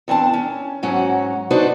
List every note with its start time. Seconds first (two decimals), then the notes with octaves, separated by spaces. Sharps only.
0.08 E2 C4 D4 A5
0.33 C#4
0.83 G#2 F#3 C#4 F#4 F#5
1.50 D4 D#4 F#4 B4 C5 D5